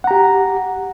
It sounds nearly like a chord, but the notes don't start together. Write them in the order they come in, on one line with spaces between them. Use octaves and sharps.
F#5 A#5 G4